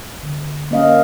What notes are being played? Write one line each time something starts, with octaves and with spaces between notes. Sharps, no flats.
D3
A#3 C#4 D#5 F5